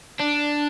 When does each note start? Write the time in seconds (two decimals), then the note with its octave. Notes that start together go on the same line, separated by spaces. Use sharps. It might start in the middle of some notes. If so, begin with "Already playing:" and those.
0.19 D4